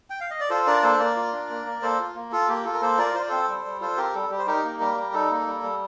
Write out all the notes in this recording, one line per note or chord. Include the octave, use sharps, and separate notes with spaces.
G5
F5
D#5
D5
F4 A4 C5
D4 A#4 D5
A#3 A4 C5
A#3 A#4 D5
F4
D4
A#3
A#3
A#3 A4 C5
F4
A#3
F4 A4
A#3 G4
F4 A4
A#4
A#3 A4 C5
F4 A#4 D5
F4 C5
D5
C4 A4 C5
G3
G3
F4 A4 C5
C4 G4 A#4
G3 A4
G3 G4
C5
D#4 G4 A#4
A#3
G3 G4 A#4
G3
D#4 A4
A#3
G3
G3